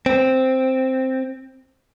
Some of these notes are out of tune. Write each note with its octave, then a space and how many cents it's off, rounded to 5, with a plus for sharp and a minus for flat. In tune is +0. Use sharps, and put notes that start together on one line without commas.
C4 +0